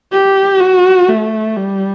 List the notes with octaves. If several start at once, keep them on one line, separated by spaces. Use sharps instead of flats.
G4
F#4
A3
G3